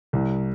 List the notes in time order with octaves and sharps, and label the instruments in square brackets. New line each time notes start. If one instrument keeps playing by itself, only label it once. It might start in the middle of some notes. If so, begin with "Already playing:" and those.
[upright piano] C2